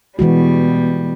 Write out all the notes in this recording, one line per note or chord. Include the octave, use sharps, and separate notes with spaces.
B2 E3 G3 G#3 F#4